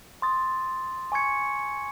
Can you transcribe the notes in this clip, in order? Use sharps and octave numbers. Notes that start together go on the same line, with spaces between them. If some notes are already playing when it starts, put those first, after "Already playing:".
C6 D#6 A6
G#5 C#6 G#6 C#7